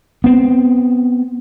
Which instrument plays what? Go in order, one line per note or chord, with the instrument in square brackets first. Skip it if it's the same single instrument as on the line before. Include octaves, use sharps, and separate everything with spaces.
[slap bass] B3 C4